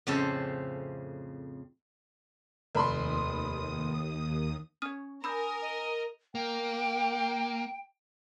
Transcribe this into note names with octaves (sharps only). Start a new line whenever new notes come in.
F2 A2 C#3 C4 A4 C5
F1 D#2 B5 C6 D#6
C#4 C#5 D#6 F6 D#7
D4 A#4 G#5 B5 D#6 E6 G6
D#5
A#3 G5